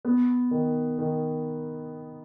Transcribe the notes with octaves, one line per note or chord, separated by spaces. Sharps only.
B3
D#3
D#3